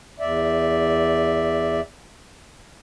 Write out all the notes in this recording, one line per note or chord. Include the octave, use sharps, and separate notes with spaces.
E2 D5 E5